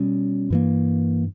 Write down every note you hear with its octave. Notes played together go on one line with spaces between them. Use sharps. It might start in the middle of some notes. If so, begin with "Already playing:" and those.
Already playing: B2 G3 C#4
G2 E3 A#3